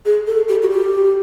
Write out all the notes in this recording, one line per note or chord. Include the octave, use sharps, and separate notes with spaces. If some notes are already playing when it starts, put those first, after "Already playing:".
G#4
A4
G4
F#4
G4